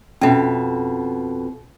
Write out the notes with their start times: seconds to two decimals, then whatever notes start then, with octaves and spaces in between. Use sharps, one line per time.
0.21 F2 B2 C#4 E5